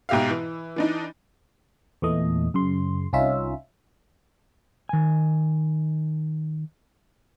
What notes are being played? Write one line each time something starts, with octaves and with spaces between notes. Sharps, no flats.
G#2 B2 G4 E5 F5
E3
E3 D4 D#4
E2 A#2 E3 A3 D#5
F#2 C#3 C6
C2 C#4 D#4 F4 E5
D#3 G#5